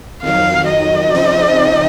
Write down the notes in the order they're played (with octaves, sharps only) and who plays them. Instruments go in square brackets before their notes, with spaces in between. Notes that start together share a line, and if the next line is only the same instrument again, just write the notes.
[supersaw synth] F2 D#3 F#3 [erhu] F5
[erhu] D#5
[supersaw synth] C#3 F3 C4 D#4